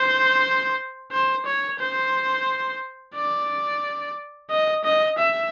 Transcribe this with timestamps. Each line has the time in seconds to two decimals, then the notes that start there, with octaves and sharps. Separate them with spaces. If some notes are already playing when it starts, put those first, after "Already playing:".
Already playing: C5
1.11 C5
1.46 C#5
1.80 C5
3.15 D5
4.50 D#5
4.84 D#5
5.18 E5